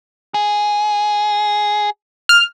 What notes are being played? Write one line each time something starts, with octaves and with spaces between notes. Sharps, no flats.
G#4
F6